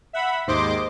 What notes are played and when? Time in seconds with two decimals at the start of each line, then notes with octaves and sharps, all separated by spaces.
0.13 E5 F#5 B5
0.47 D#2 G#2 C5 D#5 C6 D6